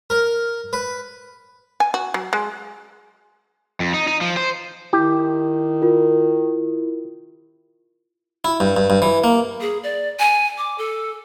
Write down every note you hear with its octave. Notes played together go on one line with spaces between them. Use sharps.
A#4
B4
G#5
F#4
F#3
G#3
F2
D#4
D#4
F3
C5
D#3 E4 G4
F4 A#4
E4
G2
G2
G2
E3
A#3
G#4
D5
G#5
D6
A4